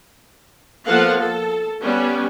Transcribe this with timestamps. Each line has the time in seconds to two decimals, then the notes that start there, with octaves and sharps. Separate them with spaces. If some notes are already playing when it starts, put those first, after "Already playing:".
0.87 F3 A#3 B3 A4 F5 F#5
1.20 A4
1.82 G3 B3 C#4 G4